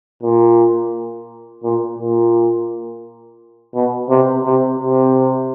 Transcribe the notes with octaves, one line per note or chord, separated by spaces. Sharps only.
A#2
A#2
A#2
B2
C3
C3
C3